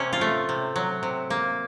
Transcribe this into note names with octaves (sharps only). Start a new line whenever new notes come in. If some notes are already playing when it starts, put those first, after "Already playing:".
Already playing: C3 A#3 C#4
F4
A3
C3
F#3
C3
A#3